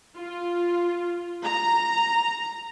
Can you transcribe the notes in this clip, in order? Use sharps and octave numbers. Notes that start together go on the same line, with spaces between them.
F4
A#5